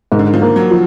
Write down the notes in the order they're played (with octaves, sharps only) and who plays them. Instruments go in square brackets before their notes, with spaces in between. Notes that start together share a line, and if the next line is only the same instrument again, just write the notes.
[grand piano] G#2 [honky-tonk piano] D#3
[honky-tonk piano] D3
D#3
F3
[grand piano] A#3
[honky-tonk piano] F#3
[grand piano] F3